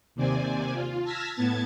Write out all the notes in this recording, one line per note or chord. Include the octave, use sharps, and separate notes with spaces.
D#2 C3 C4 D5 G#5
F4
A5 E6 F6 G#6 A#6 B6
A2 B3 A5 G#6 A6